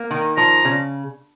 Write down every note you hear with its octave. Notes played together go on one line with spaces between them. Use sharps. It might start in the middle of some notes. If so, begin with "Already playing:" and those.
Already playing: A#3
D#3
F3 A#5
C#3